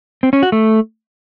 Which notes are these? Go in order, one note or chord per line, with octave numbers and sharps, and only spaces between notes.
C4
C#4
F#4
A3